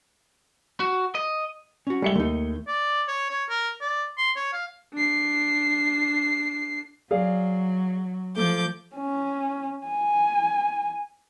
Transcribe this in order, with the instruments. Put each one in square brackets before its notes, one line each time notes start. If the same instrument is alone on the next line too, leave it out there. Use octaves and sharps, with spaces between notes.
[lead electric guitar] F#4
D#5
[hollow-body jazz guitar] C#4 F#4
[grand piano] G3 C#7 G7 [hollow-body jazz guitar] G#3 E5
[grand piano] D#2 [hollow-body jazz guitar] A3 D#4
[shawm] D5
C#5
C#5
A#4
D5
C6
C#5
F5
[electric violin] D4 C7
[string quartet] F#3 [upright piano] G#4 D5 F5
[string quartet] F3 D6 G6 [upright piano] A3
[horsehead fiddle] C#4
G#5